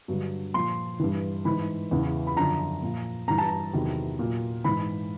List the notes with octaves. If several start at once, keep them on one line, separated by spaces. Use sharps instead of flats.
G2 D3 F#3
A#2 F3 C6
G2 E3
G#2 E3 B5
E2 C#3 E3
B5
F#2 D3 F3 A#5
A#2 F3
G2 E3 A#5
A5
A#5
E2 C3 D#3 F#3
A#2 F#3
G#2 E3 B5